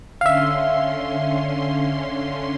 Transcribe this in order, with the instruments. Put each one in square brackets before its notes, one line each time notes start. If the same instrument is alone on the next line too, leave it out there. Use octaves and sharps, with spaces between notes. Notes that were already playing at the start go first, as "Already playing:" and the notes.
[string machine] D3 C#4 C6 [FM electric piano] E5 F5